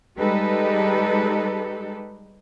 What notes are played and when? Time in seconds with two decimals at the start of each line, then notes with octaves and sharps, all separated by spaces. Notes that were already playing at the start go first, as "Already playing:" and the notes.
0.18 G3 G#3 D#4 G4 A4 B4